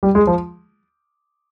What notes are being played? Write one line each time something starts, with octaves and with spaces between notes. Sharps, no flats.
G3
G#3
F3